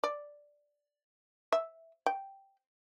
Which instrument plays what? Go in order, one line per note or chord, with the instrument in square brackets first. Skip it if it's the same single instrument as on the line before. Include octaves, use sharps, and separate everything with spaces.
[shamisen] D5
E5
G5